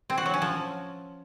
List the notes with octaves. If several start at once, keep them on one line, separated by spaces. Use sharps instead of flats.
C4
F#4
F#3
C#4
F3